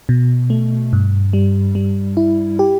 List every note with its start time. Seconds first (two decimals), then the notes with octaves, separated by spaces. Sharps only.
0.09 B2
0.50 A3
0.93 G2
1.33 G3
1.75 G3
2.17 E4
2.59 G4